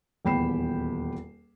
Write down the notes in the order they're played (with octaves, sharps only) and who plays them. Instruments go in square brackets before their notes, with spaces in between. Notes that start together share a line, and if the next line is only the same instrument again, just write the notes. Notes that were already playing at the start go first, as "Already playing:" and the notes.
[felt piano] D#1 E2 G5 B5 C7 E7